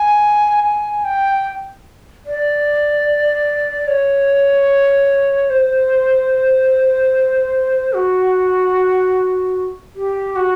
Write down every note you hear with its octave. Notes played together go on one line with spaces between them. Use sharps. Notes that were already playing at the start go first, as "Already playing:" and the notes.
Already playing: G#5
G#5
G5
D5
C#5
C5
F#4
G4
F#4